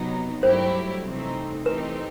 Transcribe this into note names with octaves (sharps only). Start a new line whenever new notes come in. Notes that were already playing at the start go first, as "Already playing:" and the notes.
Already playing: C3 F#3 B3 D#4
G2 F#3 A3 E4 G4 C5
C3 E3 A3 C4 D#4
E3 A3 C4 D#4 G4 B4